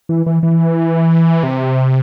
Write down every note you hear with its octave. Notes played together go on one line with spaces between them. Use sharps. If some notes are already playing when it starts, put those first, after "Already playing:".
E3
E3
E3
C3